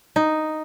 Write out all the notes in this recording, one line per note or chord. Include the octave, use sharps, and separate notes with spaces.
D#4